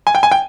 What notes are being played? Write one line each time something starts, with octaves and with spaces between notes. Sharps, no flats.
G#5
G5
G#5
G5